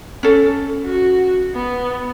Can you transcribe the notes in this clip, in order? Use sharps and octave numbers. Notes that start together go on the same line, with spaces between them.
C#4 A4
F#4
B3